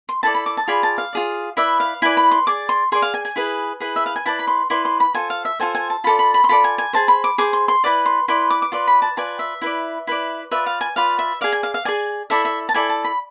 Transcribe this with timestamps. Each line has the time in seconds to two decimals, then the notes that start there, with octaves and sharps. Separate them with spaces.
0.09 C6
0.23 E4 A4 D5 A5
0.35 B5
0.46 D6
0.57 A5
0.68 F4 G#4 D5 B5
0.83 A5
0.98 F5
1.13 F4 G#4 D5
1.57 E4 B4 D5 E5
1.80 F5
2.02 E4 B4 D5 G#5
2.17 B5
2.31 C6
2.47 G#4 D5 D6
2.69 C6
2.92 G#4 D5 C6
3.02 F5
3.14 G#5
3.25 G#5
3.36 E4 G#4 B4
3.80 E4 G#4 B4
3.96 E5
4.06 F5
4.16 G#5
4.26 E4 B4 D5 A5
4.39 B5
4.47 C6
4.70 E4 B4 D5 C6
4.85 C6
5.00 B5
5.15 F4 A4 C5 G#5
5.30 F5
5.45 E5
5.60 F4 A4 C5 G#5
5.75 G#5
5.90 A5
6.04 F4 A4 D5 B5
6.19 B5
6.34 B5
6.44 C6
6.49 F4 A4 D5 B5
6.64 G#5
6.78 G#5
6.93 G#4 C5 A5
7.08 B5
7.24 D6
7.38 G#4 C5 D6
7.53 C6
7.68 C6
7.84 E4 B4 D5 D6
8.06 C6
8.28 E4 B4 D5 C6
8.50 D6
8.62 D6
8.72 F4 B4 D5 C6
8.87 B5
9.02 A5
9.17 F4 B4 D5 G#5
9.39 E5
9.62 E4 B4 D5
10.07 E4 B4 D5
10.51 F4 B4 D5 E5
10.66 F5
10.81 G#5
10.96 F4 B4 D5 F5
11.19 E5
11.41 G#4 D5 F5
11.52 G#5
11.63 F5
11.74 F5
11.85 G#4 D5 G#5
12.30 E4 A4 D5 E5
12.45 E5
12.69 A5
12.74 E4 A4 D5 G#5
12.89 A5
13.04 B5